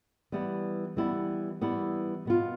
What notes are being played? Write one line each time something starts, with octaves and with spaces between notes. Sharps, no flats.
E3 G3 B3 E4
E3 G3 B3 E4
E3 G3 B3 E4
B2 B3 F4